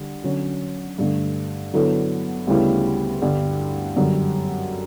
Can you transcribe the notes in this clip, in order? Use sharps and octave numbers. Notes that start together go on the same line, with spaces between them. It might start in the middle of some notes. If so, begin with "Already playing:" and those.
Already playing: D3 G3 D4
D3 F#3 C#4
G2 D3 A3
D3 F#3 B3 E4 A4
D2 C#3 G3 B3 E4
G2 D3 G3
F#2 D3 G3